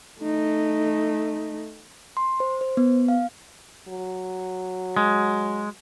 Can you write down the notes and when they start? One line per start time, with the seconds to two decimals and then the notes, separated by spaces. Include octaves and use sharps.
0.22 A3 D#4
2.17 C6
2.40 C5
2.61 C5
2.77 B3
3.08 F5
3.88 F#3
4.97 G#3